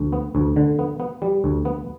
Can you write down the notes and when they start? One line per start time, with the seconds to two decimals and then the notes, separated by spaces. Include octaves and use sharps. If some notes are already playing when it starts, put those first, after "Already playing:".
Already playing: D2
0.13 B3
0.35 D2
0.56 D3
0.79 B3
1.00 B3
1.22 G3
1.44 D2
1.65 B3